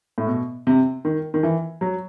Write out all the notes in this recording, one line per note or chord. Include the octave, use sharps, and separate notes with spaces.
A2
B2
C3
D#3
D#3
E3
F#3